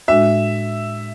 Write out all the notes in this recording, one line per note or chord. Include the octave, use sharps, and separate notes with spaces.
A2 G#3 D4 F#4 E5